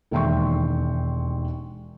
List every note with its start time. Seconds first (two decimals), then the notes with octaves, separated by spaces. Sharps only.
0.11 E1 D#2 E5 G5 C6 C#6